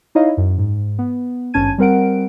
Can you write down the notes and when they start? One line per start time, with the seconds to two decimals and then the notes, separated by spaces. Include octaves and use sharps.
0.15 D#4 E4 C#5 D#5 F5
0.37 F#2
0.58 G#2
0.99 B3
1.54 G#1 G2 C#4 A5 G#6 D#7
1.78 G3 C4 A#4 F#5 D7